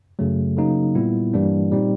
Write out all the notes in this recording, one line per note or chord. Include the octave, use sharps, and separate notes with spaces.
F#2 C#3 F#3 A3
C#3 F#3 A#3 D#4
A#2 G3 B3 E4
G2 E3 G3 A#3 D4
A#2 G3 C4 D#4